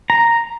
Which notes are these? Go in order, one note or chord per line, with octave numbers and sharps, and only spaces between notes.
A#5